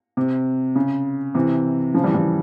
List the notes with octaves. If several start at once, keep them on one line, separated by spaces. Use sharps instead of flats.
C3
C#3
C3 E3
C#3 F3
E3 G3
E3 G3